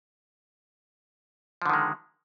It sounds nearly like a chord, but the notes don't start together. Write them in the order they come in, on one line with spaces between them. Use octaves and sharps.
F3 D3 D#3 G#3